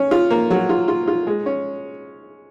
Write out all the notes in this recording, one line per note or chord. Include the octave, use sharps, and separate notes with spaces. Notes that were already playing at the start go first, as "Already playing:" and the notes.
Already playing: C#4
F4
A#3
F#3
F4
F4
F4
G#3
C#4